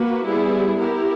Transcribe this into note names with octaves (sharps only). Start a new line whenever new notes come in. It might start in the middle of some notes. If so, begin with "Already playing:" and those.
Already playing: A#3 F#4 B4
G3 B3 E4 G#4
B3 E4 G4 A#4